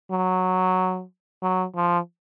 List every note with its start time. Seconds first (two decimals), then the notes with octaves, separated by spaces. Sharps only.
0.11 F#3
1.42 F#3
1.75 F3